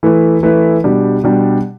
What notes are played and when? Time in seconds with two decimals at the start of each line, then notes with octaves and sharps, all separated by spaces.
0.03 E3 A3 E4 B4
0.43 E3 A3 E4 B4
0.84 B2 G3 D4 G4
1.23 B2 G3 D4 G4